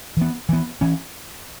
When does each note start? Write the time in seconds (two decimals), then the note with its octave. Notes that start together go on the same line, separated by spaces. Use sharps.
0.17 E3 B3
0.49 E3 B3
0.81 E3 C#4